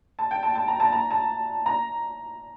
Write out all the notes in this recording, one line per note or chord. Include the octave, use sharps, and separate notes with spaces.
A5
G5
A5
A5
A#5
A5
A#5
A5
A#5